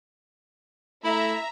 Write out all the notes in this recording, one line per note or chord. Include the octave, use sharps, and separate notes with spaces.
A3 E4 E5 A#5